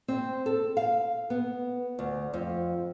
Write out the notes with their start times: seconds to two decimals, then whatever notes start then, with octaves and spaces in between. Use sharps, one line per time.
0.08 C4
0.46 A4
0.77 F5
1.30 B3
1.99 D2
2.34 F2